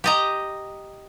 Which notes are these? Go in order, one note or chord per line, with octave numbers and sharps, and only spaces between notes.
G4 D#5 A#5